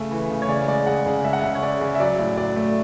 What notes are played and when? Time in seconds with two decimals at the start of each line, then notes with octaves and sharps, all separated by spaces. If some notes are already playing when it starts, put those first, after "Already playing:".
Already playing: C#3 A3
0.11 E3
0.31 C#3
0.42 C#5
0.49 C#3 D5
0.68 G#3 D5
0.86 G#3 F#5
1.06 C#3
1.25 G#3 E5
1.33 F#5
1.40 C#3 E5
1.55 C#5
1.63 G#3 D5
1.81 C#3
1.95 E5
2.00 F#3 D5
2.19 A2
2.37 F#3 D5
2.56 A3